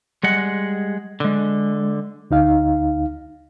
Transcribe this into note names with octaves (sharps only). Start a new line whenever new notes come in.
G3 G#3 F#5
D3 G#3
D2 D#4 F5